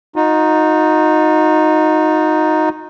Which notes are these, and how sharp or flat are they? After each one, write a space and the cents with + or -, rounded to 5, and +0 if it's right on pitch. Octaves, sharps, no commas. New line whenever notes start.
D#4 +0 F#4 -45